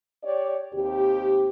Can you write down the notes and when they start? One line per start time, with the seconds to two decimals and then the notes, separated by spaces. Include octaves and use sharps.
0.23 G4 C#5 D5
0.74 D#2 C3 G4